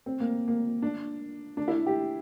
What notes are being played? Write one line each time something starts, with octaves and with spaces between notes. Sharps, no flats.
C4
A#3
A#3
D4
D4
E4
G4